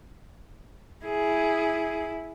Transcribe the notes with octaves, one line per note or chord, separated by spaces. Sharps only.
E4 G#4